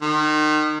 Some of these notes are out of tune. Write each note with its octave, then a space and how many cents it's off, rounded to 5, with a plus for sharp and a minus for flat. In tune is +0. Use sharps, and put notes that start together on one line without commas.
D#3 -30